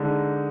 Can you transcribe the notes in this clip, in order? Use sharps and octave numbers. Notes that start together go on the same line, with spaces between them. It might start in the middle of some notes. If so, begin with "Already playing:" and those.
Already playing: D3 G#3 D#4